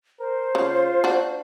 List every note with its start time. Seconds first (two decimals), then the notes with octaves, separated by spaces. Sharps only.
0.20 A#4 C5
0.55 C#3 F4
1.04 D4 F#4